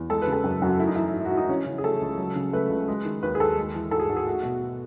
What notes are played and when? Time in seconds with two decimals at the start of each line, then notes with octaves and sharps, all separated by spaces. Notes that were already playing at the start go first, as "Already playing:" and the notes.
Already playing: E2
0.10 G#3 A4
0.22 B4
0.27 C#3
0.32 A4
0.44 F#2
0.62 F#2 F#4
0.79 A3 E4
0.88 D#4
0.96 E3 E4
1.14 G#2
1.25 F#4
1.31 G#2
1.37 D#4
1.49 E3 C#4
1.66 C#3
1.78 G#4
1.84 A3 A4
2.01 C#2
2.18 F#3
2.36 C#3
2.53 A3 B4
2.70 C#2
2.88 G#3
3.05 D#3
3.23 D#2 B4
3.35 G#4
3.40 D#2 A4
3.57 G#3
3.75 E3
3.91 G#2 A4
4.00 G#4
4.09 G#2 F#4
4.17 G#4
4.27 A3 F#4
4.43 B2